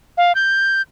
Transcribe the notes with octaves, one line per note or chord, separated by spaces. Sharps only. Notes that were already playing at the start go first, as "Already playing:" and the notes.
F5
G6